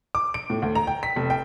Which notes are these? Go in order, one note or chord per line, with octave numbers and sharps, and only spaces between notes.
D6
D7
A2
D2
A#5
G5
B6
F1
G5